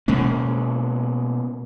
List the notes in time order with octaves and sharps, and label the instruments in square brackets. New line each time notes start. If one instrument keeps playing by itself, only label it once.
[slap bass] B2 G#3 A#3 C#4